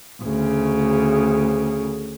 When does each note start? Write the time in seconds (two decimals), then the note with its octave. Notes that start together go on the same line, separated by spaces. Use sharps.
0.22 D2 C#3